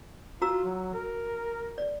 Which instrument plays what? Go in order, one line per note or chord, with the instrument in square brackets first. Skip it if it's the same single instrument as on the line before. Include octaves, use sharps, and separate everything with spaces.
[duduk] F4 [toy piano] F#4 A#5 E6
[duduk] F#3
A#4
[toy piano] D5